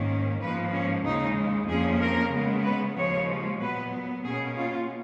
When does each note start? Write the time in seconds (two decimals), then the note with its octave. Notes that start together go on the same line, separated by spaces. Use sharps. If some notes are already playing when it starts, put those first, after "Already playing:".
Already playing: G#2 D#3 A#3 C#4
0.41 G#2 F3 A#3 B4
0.72 C#4
1.05 D#2 C#3 G#3 D#4
1.68 F2 F3 A#3 C#4 G#4
2.01 A#4
2.33 C#3 G#3 B3
2.64 B4
2.97 D#2 C#3 F3 G#3 C#5
3.60 A#2 F#3 B3 B4
4.24 B2 A#3 C#4 G#4
4.57 F4